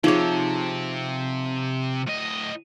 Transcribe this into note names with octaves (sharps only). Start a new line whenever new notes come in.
C3 F3 D#4 G#4 C#5
A2 D#5